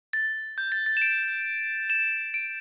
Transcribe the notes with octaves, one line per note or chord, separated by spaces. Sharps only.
A6
G6
A6
A6
E7
D7
E7
D7